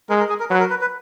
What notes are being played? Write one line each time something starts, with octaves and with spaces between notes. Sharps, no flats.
G#3 A#4
A#4
G#4
A#4
F#3 B4
A#4
B4
B4